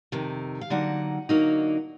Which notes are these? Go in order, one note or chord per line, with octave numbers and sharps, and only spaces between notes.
F2 C3 D#3
F5
D3 F#3 A#3 D#4 F#5
D3 F#3 A#3 D#4